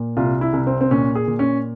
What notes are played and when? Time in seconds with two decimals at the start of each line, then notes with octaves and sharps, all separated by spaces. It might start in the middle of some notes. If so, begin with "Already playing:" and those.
Already playing: A#2
0.17 C2 F4
0.41 E4
0.53 C2
0.67 C4
0.81 C4
0.91 A#2 C#4
1.15 G#4
1.27 A#2
1.39 C#4